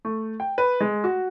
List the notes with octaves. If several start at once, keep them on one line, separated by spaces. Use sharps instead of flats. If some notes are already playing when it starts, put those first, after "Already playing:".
A3
G5
B4
G#3
F#4